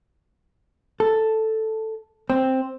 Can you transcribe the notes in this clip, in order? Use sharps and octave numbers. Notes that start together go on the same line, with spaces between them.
A4
C4